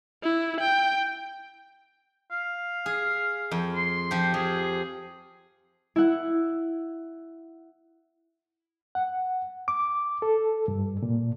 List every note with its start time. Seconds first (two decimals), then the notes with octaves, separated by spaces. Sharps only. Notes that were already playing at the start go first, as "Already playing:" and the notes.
0.23 E4
0.61 G5
2.31 F5
2.86 G#4
3.51 F2
3.75 C6
4.11 F3 G4
4.34 F3 G#4
5.96 E4 F#5
8.95 F#5
9.68 D6
10.22 A4
10.68 G2
11.03 A#2